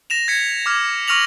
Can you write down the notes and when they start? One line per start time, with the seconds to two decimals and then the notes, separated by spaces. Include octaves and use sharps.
0.10 A#6 E7 F7
0.28 G#6 B6 C#7
0.66 D6 F6 G#6
1.08 C#6 F6 A#6 F7 F#7